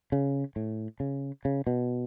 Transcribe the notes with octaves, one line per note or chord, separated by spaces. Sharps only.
C#3
A2
C#3
C#3
B2